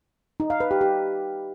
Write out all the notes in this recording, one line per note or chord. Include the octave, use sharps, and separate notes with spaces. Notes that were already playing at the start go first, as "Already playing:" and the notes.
D#4
F5
B4
G4
G4